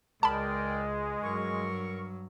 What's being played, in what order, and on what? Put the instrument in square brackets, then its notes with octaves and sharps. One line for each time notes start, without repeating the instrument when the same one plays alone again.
[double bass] C#2 [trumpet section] G#3 [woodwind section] A#4 D5 G5 [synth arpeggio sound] A5 B5
[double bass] G2 F#3 [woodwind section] A#4 C#6